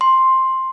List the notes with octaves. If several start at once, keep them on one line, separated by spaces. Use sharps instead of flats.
C6